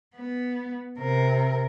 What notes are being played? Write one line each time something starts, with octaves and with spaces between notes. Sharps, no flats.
B3
C3 A#4